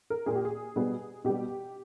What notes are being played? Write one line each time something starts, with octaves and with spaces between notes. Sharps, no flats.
A#4
A#2 A#3 G#4
G4
G#4
B2 G3 B3
B2 G3 B3 G4